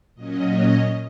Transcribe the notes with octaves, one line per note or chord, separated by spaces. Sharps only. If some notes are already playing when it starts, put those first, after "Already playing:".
A#2 F#3 C#4 D#5